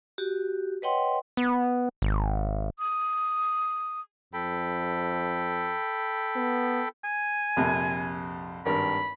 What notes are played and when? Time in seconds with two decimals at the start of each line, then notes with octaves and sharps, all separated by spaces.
0.18 F#4 G4
0.82 B4 C#5 D#5 F#5 G5 C6
1.37 B3
2.02 G#1
2.79 D#6
4.33 F2 A4 G5 B5
6.36 B3
7.04 G#5
7.57 A#1 F2 C3
8.65 G#1 G2 A#4 B5